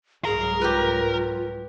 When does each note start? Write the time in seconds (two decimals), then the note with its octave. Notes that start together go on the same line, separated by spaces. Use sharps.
0.25 C2 G#2 F#3 G#4 A#4
0.61 F4 G4 B4